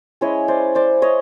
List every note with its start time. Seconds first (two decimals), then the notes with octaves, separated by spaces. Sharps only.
0.21 G#3 C#4 E4 C#5 D#5
0.48 C5 D5
0.75 C5 D5
1.02 C#5 D#5